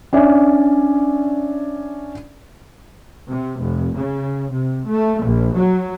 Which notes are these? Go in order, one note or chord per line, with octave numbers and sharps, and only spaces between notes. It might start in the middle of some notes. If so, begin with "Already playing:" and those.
C#4 D4 D5 E5 G#5
C3
F1
C#3
C3
A3
A#1
F#3